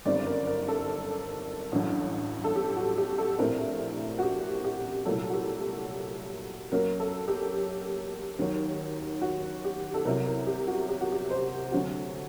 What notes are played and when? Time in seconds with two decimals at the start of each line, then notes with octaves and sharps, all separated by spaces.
0.05 G1 F#2 D#3 G3 C4 D5
0.26 A#4
0.47 A#4
0.68 A4
1.72 A1 G2 F#3
2.44 A4
2.56 G4
2.76 F#4
2.98 G4
3.18 A4
3.38 A#1 A2 A3 C4 A#4
4.19 F#4
4.23 G4
4.64 G4
5.06 C2 A#2 F#3 A3 A4
5.30 F#4
5.33 G4
5.61 A4
6.72 F#2 F#3 A#3 A#4
7.00 A4
7.28 G4
8.39 D#2 D#3 F#3
9.22 F#4
9.64 G4
9.94 A4
10.05 C2 C3 F#3 A#4
10.26 A#4
10.47 G4
10.67 F#4
10.89 G4
11.01 F#4
11.12 G4
11.30 C5
11.72 D2 D3 F#3 C4 F#4